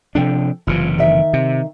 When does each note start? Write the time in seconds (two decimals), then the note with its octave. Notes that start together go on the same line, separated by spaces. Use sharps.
0.15 C3 F3 D4 A4 G5
0.67 F#1 C3 E3 F4
0.98 D#3 E5
1.33 C3